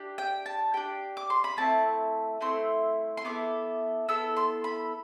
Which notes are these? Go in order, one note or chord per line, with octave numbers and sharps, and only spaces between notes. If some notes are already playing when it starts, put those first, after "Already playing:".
Already playing: D4 G4
G5
A5
D4 G4 G5
D6
C6
B5
A3 C4 E4 A5
A3 C4 E4 C6
C6
B3 E4 A4 D6
B3 E4 A4 E6
C6
B5